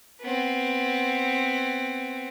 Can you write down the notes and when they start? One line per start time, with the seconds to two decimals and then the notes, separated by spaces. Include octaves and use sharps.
0.21 B3 C4